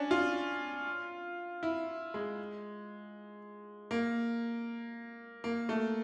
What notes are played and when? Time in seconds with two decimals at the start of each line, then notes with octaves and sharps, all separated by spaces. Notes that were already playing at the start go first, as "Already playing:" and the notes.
Already playing: C#4 D4
0.11 F4
1.63 E4
2.14 G#3
3.91 A#3
5.44 A#3
5.69 A3